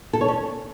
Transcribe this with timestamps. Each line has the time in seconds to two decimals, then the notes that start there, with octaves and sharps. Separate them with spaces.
0.13 A4
0.21 C#5
0.28 C#4